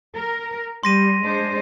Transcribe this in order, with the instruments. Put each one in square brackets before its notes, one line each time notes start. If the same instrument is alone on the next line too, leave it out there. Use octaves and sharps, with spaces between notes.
[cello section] A#4
[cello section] G3 [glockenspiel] C6 A#6 D#7
[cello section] G#3 D4 C5